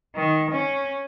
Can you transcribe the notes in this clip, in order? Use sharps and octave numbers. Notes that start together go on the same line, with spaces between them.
D#3
C#4